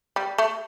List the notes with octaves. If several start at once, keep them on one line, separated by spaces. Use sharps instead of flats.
G3
A3